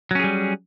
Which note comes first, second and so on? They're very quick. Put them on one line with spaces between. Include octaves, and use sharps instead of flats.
F#3 C#4 G#4 G3